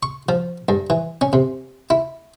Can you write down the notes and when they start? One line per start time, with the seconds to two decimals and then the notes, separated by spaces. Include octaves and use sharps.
0.03 C#6
0.29 F3
0.69 G2
0.90 E3
1.21 C#4
1.33 C3
1.90 E4